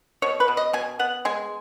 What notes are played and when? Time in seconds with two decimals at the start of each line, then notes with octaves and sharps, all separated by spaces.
0.22 B2 C#5
0.40 B4
0.48 B2
0.57 D#5
0.73 B2 G#5
0.99 B3 F#5
1.25 G#3 G#5